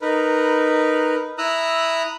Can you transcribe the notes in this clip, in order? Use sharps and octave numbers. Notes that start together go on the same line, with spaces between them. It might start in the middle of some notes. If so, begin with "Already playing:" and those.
D#4 A#4 B4
E4 A#5 D#6 E6 F#6